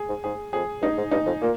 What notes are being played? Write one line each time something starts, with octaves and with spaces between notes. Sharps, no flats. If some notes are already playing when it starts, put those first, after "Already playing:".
Already playing: G#4
G#2
G#2 G#4
F2 G#4
G2 D#4
G#2
G2 D#4
F2
A#2 A#3